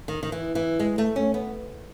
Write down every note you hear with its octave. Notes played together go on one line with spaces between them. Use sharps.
D#3
D#3
E3
E3
G#3
A3
C#4
B3